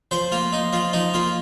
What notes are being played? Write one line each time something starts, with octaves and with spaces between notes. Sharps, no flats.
F3 C5
A#3 F4
D#4
F3 F4
F3 D#4
A#3 F4